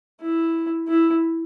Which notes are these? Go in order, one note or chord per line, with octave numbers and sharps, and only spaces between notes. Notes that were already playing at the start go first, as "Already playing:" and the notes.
E4
E4